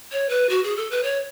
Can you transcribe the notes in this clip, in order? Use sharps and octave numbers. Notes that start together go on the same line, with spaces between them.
C#5
B4
F#4
G#4
A4
B4
C#5